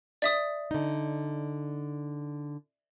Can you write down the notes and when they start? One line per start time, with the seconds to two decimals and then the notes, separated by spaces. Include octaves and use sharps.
0.22 D5 E5 D#6
0.71 D3 D#4